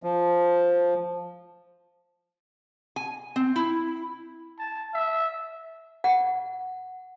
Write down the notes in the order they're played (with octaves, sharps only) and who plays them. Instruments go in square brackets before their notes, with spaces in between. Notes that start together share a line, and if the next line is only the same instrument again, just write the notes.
[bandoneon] F3
[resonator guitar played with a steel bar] G#5
C4
E4
[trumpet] A5
E5
[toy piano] F#5